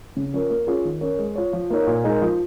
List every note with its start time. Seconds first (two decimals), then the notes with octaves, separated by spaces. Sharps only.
0.17 C#3
0.33 F3 C#4 A#4 C#5
0.50 A#3
0.67 C#4 F4 G#4 C#5
0.85 D#3
1.01 C#4 A#4 C#5
1.19 G#3
1.36 F4 C#5
1.53 F3
1.70 A#3 D#4 C#5
1.87 A#2
2.04 G#3 D#4 A#4
2.22 F3